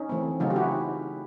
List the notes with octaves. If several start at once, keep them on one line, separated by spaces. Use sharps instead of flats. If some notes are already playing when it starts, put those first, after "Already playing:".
Already playing: C#4 D#4
E3 A3 C4
C#3 F#3 A3 C#4 D#4 F4
G4
E4 F#4